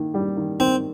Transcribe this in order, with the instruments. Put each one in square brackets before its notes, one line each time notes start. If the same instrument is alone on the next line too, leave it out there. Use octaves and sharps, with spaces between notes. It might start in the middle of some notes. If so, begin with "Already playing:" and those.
Already playing: [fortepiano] D#3 A#3
G3
D#3
[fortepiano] D#3 [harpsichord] C4